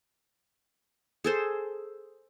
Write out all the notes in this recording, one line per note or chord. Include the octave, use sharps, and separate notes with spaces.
G#4 A4 C5